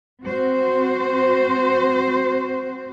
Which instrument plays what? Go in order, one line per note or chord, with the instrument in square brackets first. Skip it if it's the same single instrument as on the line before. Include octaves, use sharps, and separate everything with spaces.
[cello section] C4 F#4 C5